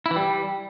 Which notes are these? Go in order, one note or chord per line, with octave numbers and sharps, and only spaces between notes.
E4
E3
G3